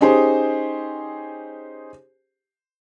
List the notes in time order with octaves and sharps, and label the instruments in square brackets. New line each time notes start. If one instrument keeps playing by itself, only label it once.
[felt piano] C#4 D#4 G4 G#4 C5